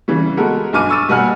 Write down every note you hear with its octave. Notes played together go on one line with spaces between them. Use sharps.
C#3 E3 G3
G#3 B3 F#4 G4 A4 A#4
B1 G2 G#5 D6 F6 D#7
C#6 E6 A6 D#7
B2 G3 A#3 F#5 G#5 F6